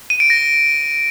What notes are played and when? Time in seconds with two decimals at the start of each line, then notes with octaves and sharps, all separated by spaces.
0.10 D#7
0.20 D7
0.30 A#6